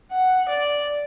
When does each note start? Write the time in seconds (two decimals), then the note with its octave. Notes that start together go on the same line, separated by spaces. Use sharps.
0.11 F#5
0.49 D5